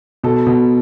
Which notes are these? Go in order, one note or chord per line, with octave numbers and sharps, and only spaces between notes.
B2 A4
B2